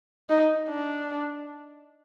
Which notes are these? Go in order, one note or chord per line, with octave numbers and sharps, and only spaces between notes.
D#4
D4